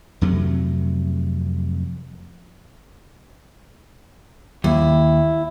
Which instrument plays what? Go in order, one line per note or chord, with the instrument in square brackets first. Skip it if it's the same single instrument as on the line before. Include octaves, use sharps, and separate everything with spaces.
[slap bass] F2 C3 F#3 A3
[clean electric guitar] D#2 [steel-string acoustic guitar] E4